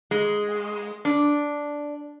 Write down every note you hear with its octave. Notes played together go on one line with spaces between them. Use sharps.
G#3
D4